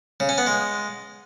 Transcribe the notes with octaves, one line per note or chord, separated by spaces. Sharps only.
C#3
C#4
B3
G#3